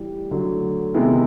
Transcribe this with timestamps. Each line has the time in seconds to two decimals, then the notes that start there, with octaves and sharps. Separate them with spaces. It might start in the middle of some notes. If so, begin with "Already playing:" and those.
Already playing: A2 E3 G3
0.31 D3 F#3 A3
0.94 C3 D#3 G#3 B3 E4